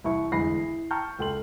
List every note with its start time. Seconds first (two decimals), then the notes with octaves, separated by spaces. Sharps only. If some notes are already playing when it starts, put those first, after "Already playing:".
0.04 C2 E3 E4 E5 C#6
0.32 G1 E2 G#3 B5 A#6 C7
0.58 E4
0.91 G5 A5 A#5 C#6 F6 G6
1.19 C#2 A4 G5 C6 F#7